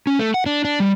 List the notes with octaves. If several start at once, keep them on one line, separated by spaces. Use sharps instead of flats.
C#4
A3
F#5
D4
D4
G3